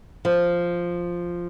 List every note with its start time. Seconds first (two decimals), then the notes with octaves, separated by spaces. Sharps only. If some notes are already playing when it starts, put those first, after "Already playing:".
0.25 F3